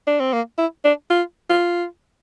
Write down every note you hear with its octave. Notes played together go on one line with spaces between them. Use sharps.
D4
C4
A#3
E4
D4
F4
F4